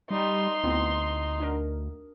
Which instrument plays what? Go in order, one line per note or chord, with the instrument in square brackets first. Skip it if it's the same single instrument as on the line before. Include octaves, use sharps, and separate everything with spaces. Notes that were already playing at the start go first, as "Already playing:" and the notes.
[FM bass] G3 [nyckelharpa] D#4 [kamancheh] C6
[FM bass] D2 [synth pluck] B3 C4 E4
[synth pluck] D4 F#4 A#4